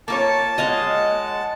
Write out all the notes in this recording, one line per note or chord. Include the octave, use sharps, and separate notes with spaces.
A#3 F4 C#5 A5
G#3 D#5 F5 F#5 G#5